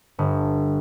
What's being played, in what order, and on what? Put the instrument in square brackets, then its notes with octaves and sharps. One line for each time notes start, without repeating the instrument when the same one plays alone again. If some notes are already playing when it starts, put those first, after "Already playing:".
[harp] G1